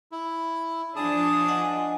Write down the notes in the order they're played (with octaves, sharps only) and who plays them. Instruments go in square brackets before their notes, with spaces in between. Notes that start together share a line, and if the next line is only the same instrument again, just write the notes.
[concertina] E4
[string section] F3 D4 [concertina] G#4 A5 D#6
[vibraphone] D#5 F#5 G#5